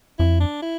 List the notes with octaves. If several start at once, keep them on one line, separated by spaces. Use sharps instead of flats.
F2 E4
D4
E4